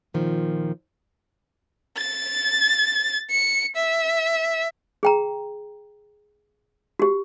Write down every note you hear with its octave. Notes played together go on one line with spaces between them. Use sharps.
A#2 D#3 F3
A6
C#7
E5
G#4 G5 A#5
F#4 G4